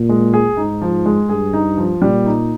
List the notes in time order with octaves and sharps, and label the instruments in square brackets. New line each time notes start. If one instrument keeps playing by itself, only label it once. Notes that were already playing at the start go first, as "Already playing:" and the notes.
Already playing: [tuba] A#2
[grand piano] G#3
G#4
[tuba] G#2 [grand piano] D#4
[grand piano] F3
G#3
[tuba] G2 [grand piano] G#4
[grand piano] D#4
F3
[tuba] A#2 [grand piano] G3
[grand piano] D#4